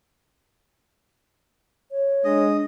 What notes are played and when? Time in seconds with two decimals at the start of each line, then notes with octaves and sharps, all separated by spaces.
1.91 C#5
2.24 G#3 D4 D#5